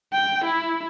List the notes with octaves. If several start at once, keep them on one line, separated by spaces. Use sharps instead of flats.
G5
E4